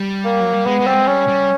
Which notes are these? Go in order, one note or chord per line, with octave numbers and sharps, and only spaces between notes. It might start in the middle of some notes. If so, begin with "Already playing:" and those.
Already playing: G3
A#3
F#3
G3
G#3 B3
G#3
G3 C4
G#3
G3 C#4
G3